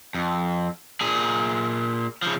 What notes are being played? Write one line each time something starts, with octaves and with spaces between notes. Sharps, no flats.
F2
A#2 G#4
C#3 F3